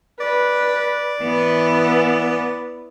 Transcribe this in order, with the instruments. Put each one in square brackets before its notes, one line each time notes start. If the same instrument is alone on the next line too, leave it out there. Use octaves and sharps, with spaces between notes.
[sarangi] B4 [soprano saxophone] D5
[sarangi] E3 [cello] B3